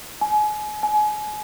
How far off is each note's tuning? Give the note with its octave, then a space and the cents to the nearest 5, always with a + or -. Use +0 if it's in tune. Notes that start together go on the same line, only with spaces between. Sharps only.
G#5 +30
G#5 +30